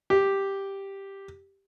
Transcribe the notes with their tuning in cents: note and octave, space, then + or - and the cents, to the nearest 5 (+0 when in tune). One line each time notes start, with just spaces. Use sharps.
G4 +0